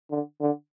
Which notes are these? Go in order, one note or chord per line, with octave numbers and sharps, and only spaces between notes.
D3
D3